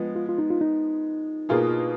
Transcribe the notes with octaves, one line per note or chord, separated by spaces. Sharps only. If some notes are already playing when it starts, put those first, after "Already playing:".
Already playing: F3 G#3 B3
F4
F4
D#4
F4
D#4
B2 A#3 F4 G#4